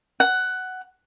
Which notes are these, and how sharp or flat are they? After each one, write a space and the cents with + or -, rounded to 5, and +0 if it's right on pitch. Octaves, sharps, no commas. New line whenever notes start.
F#5 +10